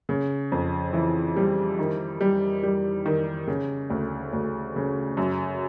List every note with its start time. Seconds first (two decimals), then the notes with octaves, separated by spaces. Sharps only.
0.09 C#3
0.52 F2
0.93 E3
1.36 G3
1.79 D#3
2.21 G3
2.63 G3
3.06 D#3
3.47 C#3
3.90 D2
4.33 D2
4.76 C#3
5.17 F#2